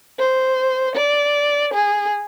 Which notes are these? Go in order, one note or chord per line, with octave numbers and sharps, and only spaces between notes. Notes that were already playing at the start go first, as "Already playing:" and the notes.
C5
D5
G#4